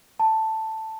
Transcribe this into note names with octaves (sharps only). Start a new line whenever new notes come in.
A5